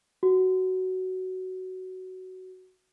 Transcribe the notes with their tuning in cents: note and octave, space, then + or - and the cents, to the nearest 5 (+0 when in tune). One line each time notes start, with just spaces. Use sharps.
F#4 +10